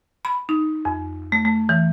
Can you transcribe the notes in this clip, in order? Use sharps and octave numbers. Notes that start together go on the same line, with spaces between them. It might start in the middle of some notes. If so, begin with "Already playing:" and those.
B5
D#4
F2
A3
A3
E3